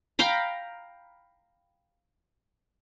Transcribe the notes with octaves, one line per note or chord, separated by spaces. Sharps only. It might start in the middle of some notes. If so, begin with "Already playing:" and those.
F5 G5 A#5 B5